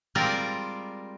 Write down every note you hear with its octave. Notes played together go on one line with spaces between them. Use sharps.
G3 G#3 C4 F4 A#4 D5